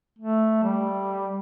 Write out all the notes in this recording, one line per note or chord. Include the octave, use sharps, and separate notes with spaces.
A3
G3